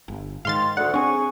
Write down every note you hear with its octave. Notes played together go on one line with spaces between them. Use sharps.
G1
G#2 D#3 F5 C6 A6
D2 F#5
C4 D4 G#4 C#6